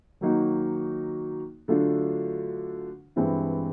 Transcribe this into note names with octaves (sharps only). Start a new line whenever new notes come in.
D#3 F#3 A#3 D#4 F#4
D3 F#3 A3 D4 F4
G2 E3 G#3 C4 E4